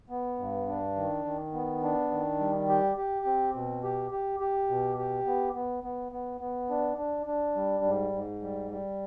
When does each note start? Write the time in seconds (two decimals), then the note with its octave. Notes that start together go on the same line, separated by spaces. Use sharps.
0.10 B3
0.39 G2
0.68 D4
0.96 D#3
1.25 D#3
1.53 B3
1.82 D4
2.11 D#3
2.40 G3
2.68 G4
2.97 G4
3.26 C4
3.54 B2
3.83 G4
4.11 G4
4.40 G4
4.69 B2
4.98 G4
5.27 B3
5.55 B3
5.84 B3
6.12 B3
6.41 B3
6.70 D4
6.98 D4
7.26 D4
7.56 G3
7.84 G#2
8.12 G#2
8.42 G3
8.71 G3